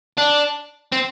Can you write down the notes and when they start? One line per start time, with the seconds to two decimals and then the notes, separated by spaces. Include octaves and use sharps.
0.18 D4
0.92 C4